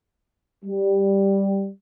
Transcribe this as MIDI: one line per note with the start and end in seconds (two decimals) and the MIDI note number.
0.65 1.69 55